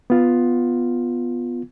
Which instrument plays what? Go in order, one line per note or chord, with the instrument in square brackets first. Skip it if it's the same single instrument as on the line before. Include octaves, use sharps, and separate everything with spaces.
[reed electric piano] B3 F4